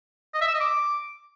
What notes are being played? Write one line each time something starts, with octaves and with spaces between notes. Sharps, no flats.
D#5
E5
E6
D#5
D6